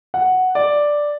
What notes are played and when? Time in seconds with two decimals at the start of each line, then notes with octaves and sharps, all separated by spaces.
0.14 F#5
0.55 D5